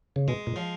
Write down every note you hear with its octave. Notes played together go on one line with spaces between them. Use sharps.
C#3
B2 G#3
A#2
F3